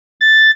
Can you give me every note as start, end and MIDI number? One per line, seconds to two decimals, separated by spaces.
0.21 0.51 93